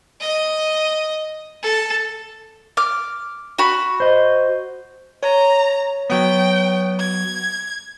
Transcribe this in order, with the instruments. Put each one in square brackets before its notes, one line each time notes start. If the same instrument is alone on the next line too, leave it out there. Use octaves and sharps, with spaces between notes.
[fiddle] D#5
A4
[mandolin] D6 F6
F#4 B5
[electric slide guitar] C5 D#5
[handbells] C#5 [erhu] A#5
[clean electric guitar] F#3 B3 [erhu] G5
[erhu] G#6